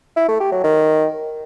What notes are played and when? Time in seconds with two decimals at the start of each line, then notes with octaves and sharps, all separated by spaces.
0.16 E4
0.28 A3
0.40 G4
0.52 F#3
0.64 D#3